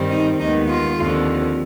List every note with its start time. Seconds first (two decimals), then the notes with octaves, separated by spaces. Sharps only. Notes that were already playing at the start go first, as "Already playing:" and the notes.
Already playing: G2 D#3 G3 C4
0.11 D#4
0.40 D#2 D#3 G#3 B3 D#4
0.69 F4
0.98 D#2 D3 F3 C4